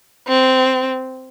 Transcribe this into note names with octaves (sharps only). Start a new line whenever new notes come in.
C4